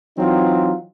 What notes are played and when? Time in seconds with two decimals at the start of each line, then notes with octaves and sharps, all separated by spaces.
0.18 E3 F#3 C4 D#4 F4